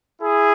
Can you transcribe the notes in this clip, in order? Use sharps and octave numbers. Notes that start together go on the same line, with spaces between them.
E4 G#4